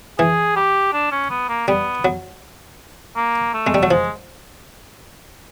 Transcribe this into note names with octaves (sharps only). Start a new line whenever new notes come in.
E3 G#4
G4
D4
C#4
B3
A#3
G3 B3
F#3
A#3
A3
G#3
G3
F#3
F3 G#3